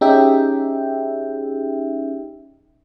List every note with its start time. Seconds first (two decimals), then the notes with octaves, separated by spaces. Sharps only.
0.01 C#4 D#4 G4 G#4 E5 G5